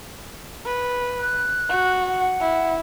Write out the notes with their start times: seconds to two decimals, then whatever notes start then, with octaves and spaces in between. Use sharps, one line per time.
0.66 B4
1.20 F#6
1.69 F#4
2.06 F#5
2.41 E4